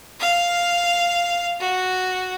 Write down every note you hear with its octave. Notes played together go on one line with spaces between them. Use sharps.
F5
F#4